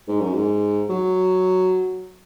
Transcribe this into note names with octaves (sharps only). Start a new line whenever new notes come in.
G#2
F#2
G#2
F#3